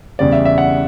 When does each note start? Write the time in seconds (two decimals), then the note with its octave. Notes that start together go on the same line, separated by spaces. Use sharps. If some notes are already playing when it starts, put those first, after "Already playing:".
0.19 E2 C#3 G3 D5
0.32 E5
0.45 E5
0.58 F#5